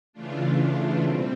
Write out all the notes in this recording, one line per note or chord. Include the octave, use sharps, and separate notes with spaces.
C#3 E3 A3 D4 F4
B2 G3 C4